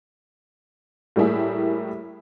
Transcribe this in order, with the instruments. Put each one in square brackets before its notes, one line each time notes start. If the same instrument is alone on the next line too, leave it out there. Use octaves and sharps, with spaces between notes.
[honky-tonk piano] A2 G3 A#3 E4 G#4